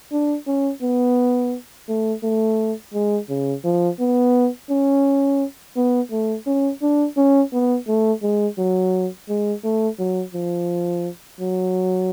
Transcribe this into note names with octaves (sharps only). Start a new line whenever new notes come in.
D4
C#4
B3
A3
A3
G#3
C#3
F3
B3
C#4
B3
A3
C#4
D4
C#4
B3
A3
G#3
F#3
G#3
A3
F#3
F3
F#3